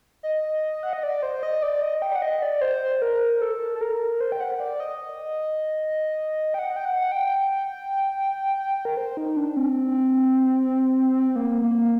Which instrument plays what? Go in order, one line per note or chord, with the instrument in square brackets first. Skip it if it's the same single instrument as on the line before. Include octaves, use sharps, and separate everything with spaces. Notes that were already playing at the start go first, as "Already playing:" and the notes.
[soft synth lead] D#5
F#5
D#5
D5
C5
D#5
D5
D#5
G5
F#5
D#5
D5
C5
A#4
A4
A4
A#4
C5
G5
F#5
D5
D#5
G5
F#5
G5
F#5
G5
A#4
C5
D#4
D4
C4
A#3
A#3